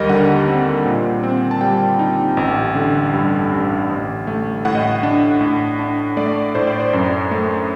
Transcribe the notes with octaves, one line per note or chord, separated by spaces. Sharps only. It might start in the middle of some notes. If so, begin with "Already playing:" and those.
Already playing: D#2 G3 A#4 D#5
D3 F#5
C4
A#2
C4
A5
G3 G5
D#4
A1
D3
G2
A1
A1
A3
A2 F#5
D#5
F#5
D4
A2
D4
A3 D5
A2 C5
D5
C5
F#2
A3